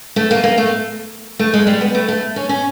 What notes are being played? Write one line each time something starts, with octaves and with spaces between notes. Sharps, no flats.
A3
A#3
A#3
A3
A3
G#3
G3
B3
A3
A3
C#4
C#4